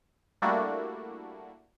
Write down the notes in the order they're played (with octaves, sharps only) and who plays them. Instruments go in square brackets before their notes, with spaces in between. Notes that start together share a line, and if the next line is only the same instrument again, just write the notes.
[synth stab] G3 A3 A#3 D4 E4 F#4